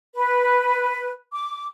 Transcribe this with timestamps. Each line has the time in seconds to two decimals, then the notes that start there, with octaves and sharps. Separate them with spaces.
0.15 B4
1.32 D6